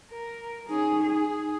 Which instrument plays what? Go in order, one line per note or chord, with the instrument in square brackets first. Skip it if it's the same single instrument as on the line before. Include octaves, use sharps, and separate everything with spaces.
[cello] A#4
[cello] C#4 G#4 [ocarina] D#4
[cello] G#4